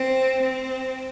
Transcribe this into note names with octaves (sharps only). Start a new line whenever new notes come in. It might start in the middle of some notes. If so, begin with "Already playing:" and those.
Already playing: C4
C4